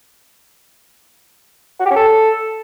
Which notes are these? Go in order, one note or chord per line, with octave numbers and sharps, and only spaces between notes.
F#4
G4
C#4
A4